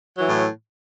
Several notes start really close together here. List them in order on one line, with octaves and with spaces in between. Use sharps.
F#3 E3 A2